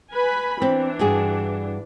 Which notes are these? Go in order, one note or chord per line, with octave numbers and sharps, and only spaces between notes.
B4 G#5 B5
E3 C4 D4
G2 F#4 G#4